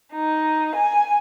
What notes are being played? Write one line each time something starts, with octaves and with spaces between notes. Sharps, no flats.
D#4
G#5